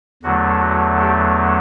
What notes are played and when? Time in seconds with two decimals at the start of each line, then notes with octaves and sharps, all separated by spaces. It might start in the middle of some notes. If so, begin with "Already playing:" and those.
0.23 E2 D3 F#3 A3 F#4
0.61 F#4
1.00 G4